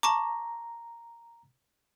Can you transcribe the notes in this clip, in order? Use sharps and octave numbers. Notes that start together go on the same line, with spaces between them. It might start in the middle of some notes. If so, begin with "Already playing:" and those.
A5 A#5 C#6 D6